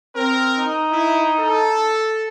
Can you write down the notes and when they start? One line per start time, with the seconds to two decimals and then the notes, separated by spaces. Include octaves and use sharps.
0.16 C4 A#4
0.58 D#4
0.91 E4
1.39 A4